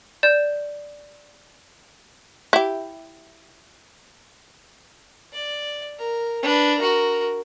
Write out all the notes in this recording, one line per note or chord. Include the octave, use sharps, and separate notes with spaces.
D5 G6 E7
E4 G4
D5
A#4
D4 B4
F#4 A#4